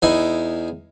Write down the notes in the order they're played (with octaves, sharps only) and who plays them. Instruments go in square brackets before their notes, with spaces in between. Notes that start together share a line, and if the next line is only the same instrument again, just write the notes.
[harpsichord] E2 D#4 E4 G#5